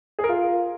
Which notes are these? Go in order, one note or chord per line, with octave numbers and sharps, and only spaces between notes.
G#4
A#4
F4